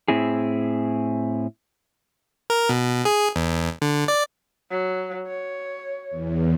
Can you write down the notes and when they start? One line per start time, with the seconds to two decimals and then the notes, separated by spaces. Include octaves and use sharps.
0.08 A2 C4 E4 G#4
2.50 A#4
2.69 B2
3.05 G#4
3.36 E2
3.82 D3
4.08 D5
4.71 F#3
5.27 C#5
6.11 E2